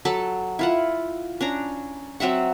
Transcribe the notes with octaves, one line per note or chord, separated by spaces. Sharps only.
F#3 A4 A5 B5
E4 F4 F#5
C#4 D4 A#5
F#3 C4 E5 F#5